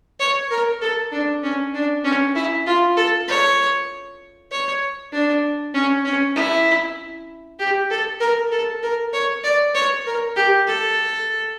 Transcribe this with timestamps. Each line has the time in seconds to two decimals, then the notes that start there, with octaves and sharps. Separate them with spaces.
0.20 C#5
0.50 A#4
0.81 A4
1.12 D4
1.43 C#4
1.74 D4
2.04 C#4
2.36 E4
2.67 F4
2.97 A4
3.28 C#5
4.51 C#5
5.13 D4
5.74 C#4
6.05 C#4
6.36 E4
7.59 G4
7.90 A4
8.20 A#4
8.51 A4
8.83 A#4
9.13 C#5
9.44 D5
9.75 C#5
10.06 A#4
10.36 G4
10.67 A4